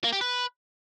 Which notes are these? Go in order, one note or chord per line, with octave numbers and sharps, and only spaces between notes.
A#3
G4
B4